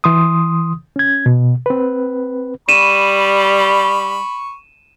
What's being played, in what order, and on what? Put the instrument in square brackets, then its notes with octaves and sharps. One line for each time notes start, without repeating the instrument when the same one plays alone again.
[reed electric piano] E3 C6 D#6
C#4 G#6
B2
C4 B4
[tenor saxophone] G3 [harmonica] B5 C#6 [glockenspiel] D#7 E7